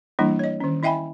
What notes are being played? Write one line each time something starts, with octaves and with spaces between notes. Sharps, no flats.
E3 G3 A#3 D4 E4
C#5 D#5
D#3 C#4
E4 D#5 E5 G5 G#5 B5